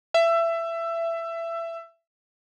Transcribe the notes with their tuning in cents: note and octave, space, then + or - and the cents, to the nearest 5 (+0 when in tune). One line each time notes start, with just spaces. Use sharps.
E5 +20